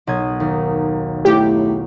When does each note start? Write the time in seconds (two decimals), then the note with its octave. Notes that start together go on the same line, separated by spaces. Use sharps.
0.07 B1 D#6 G#6
0.40 D#2
1.25 A2 G4